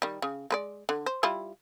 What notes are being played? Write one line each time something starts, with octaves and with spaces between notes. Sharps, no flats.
D#3 G3
C#3
G#3 B4 D5
D3
C5
G3 E4 F4